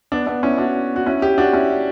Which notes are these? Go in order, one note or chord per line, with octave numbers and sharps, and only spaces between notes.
B3 D4
B3 D4
C#4 E4
D4 F#4
F#4
C#4 E4
E4 G4
D4 F#4
C#4 E4